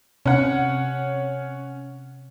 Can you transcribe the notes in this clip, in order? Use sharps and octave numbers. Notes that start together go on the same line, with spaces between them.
C3 C#4 F#5